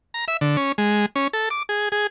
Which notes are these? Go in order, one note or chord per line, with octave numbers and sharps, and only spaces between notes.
A#5
E5
D3
C#4
G#3
C#4
A4
D6
G#4
G#4